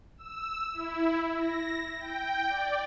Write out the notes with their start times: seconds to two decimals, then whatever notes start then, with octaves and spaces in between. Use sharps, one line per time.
0.18 E6
0.74 E4
1.37 A#6
1.99 G5
2.49 D5